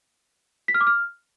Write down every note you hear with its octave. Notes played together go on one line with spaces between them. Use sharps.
B6
F6
D6
F6